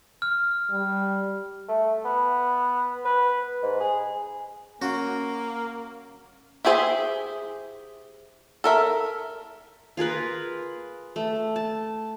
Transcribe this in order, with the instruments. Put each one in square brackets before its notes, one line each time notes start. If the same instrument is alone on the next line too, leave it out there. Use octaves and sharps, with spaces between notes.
[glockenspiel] F6
[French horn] G3
[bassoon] A3
B3
B4
G#2
G#4
[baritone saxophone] A#3 [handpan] C#4 [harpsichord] F#4
[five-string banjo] E4 G4 G#4 C5 E5
A4 A#4 E5
[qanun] F4 G#4 A#4 B4
A3
A5